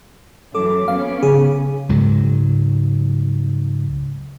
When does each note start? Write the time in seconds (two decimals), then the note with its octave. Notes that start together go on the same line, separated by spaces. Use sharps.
0.55 F#2 E3 A4 D6
0.88 B3 C#4 F5
1.23 G#1 C#3 G#4
1.89 C#2 G#2 F#3